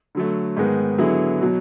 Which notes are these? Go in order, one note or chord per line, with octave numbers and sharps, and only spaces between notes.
D3 F#3 A3
G#2 D#3 G#3 B3
D3 F#3 B3 E4 G#4
B2 F#3